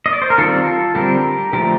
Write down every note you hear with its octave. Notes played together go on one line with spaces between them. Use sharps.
D#5
D5
C5
A#4
D#3 G3 C4 F4 A4
D3 G3 C4 G4 A#4
D3 F3 A3 G4 A#4